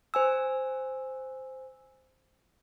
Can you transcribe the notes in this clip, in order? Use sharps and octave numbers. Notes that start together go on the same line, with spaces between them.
C5 G#5 E6